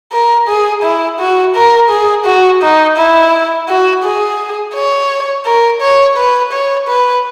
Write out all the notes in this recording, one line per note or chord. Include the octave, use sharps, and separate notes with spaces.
A#4
G#4
E4
F#4
A#4
G#4
F#4
D#4
E4
F#4
G#4
C#5
A#4
C#5
B4
C#5
B4